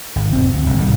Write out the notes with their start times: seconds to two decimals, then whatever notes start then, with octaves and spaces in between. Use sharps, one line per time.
0.16 G#1
0.33 F1 E2 C4
0.53 D2
0.66 G1 C2
0.81 B1 G#2 D#3 G3